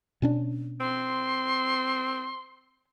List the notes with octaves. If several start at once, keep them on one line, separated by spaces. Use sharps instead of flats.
B2 C#4 D4
C4 C6